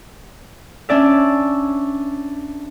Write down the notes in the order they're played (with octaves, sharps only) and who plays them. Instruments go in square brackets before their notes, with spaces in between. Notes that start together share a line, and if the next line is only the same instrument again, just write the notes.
[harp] C#4 D4 D5 E5